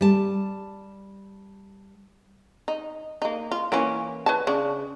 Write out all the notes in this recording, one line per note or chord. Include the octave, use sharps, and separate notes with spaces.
G3 A5
D#4
A#3 D#4
F4
E3 A#3 C#4
B4 C#5 A5
C#3 D4